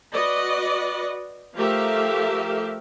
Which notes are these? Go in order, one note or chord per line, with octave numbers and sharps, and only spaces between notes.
F#4 B4 D5 D#5
F3 A3 G4 A#4 E5 F5